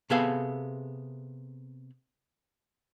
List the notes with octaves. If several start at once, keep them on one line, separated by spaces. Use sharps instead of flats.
C3 B3 G#4 A4 F5